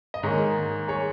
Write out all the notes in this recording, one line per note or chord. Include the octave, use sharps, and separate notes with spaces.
D#5
G#2 D#3 A#3 G#4 C#5
G#4 C#5